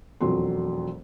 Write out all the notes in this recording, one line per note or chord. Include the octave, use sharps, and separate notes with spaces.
E1 F2 F#3 C6